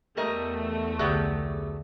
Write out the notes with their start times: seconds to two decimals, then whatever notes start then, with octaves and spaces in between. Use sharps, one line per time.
0.17 E2 G3 A3 A#4 D#5
0.99 C2 D3 F#3 B3 G4 G#4 E5